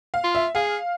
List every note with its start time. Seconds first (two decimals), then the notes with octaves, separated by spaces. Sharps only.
0.14 F5
0.24 F4
0.35 E5
0.55 G#4 F5